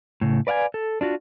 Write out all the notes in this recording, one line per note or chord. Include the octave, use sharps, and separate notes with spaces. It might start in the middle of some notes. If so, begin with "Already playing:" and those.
A2 C#3
B4 D5 F5 F#5 G#5
A4
D4 F4 F#4